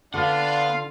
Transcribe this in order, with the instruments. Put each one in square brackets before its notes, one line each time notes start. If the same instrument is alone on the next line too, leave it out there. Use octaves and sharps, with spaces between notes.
[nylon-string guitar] D3 [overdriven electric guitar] B3 F#5 [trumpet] D4 [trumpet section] F4 F5